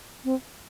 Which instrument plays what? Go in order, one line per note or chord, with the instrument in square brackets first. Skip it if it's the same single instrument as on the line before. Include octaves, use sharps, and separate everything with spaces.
[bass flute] C4